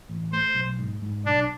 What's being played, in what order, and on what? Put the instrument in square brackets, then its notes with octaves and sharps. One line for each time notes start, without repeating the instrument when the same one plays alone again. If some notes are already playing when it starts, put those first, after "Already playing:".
[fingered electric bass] A1
[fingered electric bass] A3 [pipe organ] C5
[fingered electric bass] B1
G#2
G#2
[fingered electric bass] B1 [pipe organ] D4